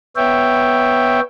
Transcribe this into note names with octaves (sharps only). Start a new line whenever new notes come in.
B3 C#5 E5 G5